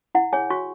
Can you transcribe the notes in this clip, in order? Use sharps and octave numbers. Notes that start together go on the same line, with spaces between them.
E4 F#5
G#4 C#5 G#5
F#4 C#6